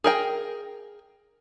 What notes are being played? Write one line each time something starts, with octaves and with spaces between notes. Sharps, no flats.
G#4 A#4 G5